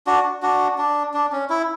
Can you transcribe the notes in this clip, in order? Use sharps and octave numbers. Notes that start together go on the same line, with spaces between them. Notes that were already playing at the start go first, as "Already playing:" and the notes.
D4 F#4
D4 F#4
D4
D4
C#4
E4